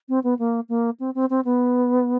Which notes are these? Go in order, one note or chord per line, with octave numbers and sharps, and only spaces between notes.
C4
B3
A#3
A#3
C4
C4
C4
B3